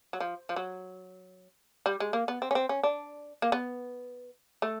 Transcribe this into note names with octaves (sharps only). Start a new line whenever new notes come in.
F#3
F3
F3
F#3
G3
G#3
A#3
B3
C4
C#4
C4
C#4
D4
A#3
B3
A3